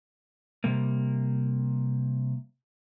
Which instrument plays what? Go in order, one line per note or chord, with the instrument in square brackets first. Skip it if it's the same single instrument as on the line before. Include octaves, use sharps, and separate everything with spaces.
[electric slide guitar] C3 G3 A#3